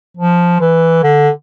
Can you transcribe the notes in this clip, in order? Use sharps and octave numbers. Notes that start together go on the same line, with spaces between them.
F3
E3
D3